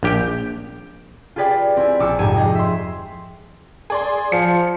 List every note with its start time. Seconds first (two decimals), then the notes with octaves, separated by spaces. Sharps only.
0.03 A#1 G4 G5
1.36 F4 G4 G#4 B4 D5 G5
1.77 C4 E4 G#5
2.00 A#1 F4 D6 E6 C#7
2.19 F1 G#2 G4 G#6 D#7
2.34 G#4 D#5 G5
2.55 E5 C6
3.90 G#4 D5 C6
4.32 F3 C#7